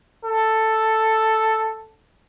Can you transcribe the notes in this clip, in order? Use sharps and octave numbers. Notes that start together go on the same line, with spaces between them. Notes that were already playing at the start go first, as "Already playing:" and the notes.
A4